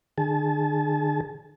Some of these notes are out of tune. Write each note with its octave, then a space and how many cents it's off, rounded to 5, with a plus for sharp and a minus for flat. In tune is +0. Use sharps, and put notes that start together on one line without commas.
D3 +40 G#4 +0 A5 -30